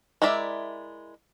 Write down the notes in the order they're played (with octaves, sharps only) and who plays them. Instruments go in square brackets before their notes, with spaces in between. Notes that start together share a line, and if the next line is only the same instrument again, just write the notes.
[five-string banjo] G#3 E4 A#4 D5 E5